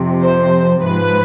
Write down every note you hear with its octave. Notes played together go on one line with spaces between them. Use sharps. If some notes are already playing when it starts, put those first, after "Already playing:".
Already playing: F2 C3 F3
C5
G#2 F3 B4